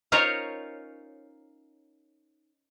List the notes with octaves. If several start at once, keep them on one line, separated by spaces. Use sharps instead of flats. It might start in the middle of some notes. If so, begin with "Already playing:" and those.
C#4 D#4 F4 A#4 C5 C#5